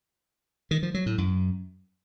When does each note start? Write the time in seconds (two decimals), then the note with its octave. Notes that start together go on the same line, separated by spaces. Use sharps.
0.71 D#3
0.83 F3
0.94 F#3
1.06 A2
1.18 F#2